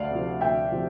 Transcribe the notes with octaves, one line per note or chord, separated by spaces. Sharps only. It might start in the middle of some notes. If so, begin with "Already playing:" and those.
Already playing: D2 D5 F5
C3 F3
D2 E5 G5
C3 F3